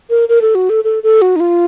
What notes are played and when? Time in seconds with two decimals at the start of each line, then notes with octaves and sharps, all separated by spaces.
0.10 A#4
0.29 A#4
0.42 A4
0.55 F#4
0.70 A4
0.84 A4
1.03 A4
1.22 F#4
1.36 D#4
1.40 F4